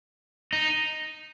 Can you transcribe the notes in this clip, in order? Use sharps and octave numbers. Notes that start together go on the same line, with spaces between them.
D#4